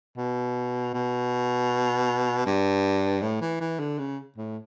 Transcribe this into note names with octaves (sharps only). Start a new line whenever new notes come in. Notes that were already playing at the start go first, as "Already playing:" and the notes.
B2
B2
G2
A2
E3
E3
D3
C#3
A2